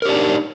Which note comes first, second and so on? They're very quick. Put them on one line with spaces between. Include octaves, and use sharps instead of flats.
A#4 G4 D4 D#4